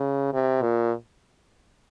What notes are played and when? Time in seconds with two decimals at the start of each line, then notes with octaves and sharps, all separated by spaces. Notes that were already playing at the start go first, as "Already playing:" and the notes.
Already playing: C#3
0.33 C3
0.62 A#2